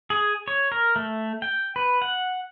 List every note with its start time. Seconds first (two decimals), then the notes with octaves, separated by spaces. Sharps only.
0.10 G#4
0.48 C#5
0.72 A#4
0.96 A3
1.42 G5
1.76 B4
2.02 F#5